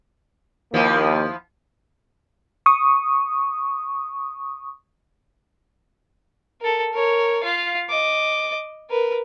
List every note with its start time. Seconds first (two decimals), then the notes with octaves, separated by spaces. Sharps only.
0.74 D#2 F3 A#3 B3 E4
2.66 C#6 D#6
6.61 A4 A#4
6.93 A#4 C#5
7.43 F4 F5
7.89 D#5 D6
8.90 A#4 B4